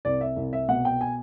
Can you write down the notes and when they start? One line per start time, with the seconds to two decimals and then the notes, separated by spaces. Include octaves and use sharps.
0.05 C2 D5
0.21 E5
0.36 C2
0.53 E5
0.68 B2 F#5
0.85 G5
1.01 G#5